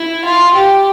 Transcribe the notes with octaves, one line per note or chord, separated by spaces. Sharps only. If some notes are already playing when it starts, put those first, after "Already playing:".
Already playing: E4
F4
G4